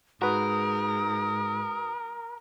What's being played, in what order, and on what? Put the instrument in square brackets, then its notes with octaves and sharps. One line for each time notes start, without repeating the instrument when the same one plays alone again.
[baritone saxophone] G#2 [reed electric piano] F#4 B4 [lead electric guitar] A#4 [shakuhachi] D#6